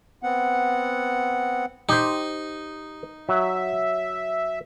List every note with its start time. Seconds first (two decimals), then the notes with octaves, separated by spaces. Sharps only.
0.23 B3 C4 F#5
1.89 D#4 G4 C5
3.29 F#3 E5